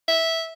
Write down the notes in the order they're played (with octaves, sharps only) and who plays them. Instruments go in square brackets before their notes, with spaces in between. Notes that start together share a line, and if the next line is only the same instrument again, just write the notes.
[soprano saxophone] E5